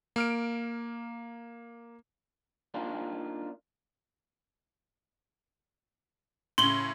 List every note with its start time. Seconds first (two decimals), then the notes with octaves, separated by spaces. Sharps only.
0.16 A#3 F6 D7
2.74 A#3 D4 D#4 F4
6.58 A2 C#3 C6 F#7 G7